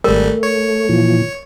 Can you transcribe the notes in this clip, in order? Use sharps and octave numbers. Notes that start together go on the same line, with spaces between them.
G#1 G3 A3 A#4
C#5
A#2 E3 F3